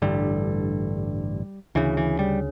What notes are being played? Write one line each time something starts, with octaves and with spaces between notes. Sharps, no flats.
A1 G2 D3 G3
D2 C#3 E3
E3
G3